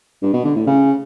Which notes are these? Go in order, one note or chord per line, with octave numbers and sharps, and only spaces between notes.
G2
B2
D3
A2
C#3